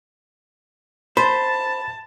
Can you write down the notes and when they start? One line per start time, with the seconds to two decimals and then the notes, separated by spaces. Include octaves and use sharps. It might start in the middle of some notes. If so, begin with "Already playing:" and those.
1.17 C5 A5 B5